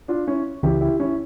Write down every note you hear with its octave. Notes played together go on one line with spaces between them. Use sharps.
D4 F4
C#4 E4
C#2 C#3 E3 E4 G4
E4 G4
C#4 E4